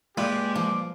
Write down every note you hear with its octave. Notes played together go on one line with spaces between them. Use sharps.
A#2 G#3 G4 B4
F3 D6